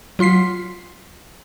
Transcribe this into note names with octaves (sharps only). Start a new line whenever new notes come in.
F#3 F4 C6 B6 C7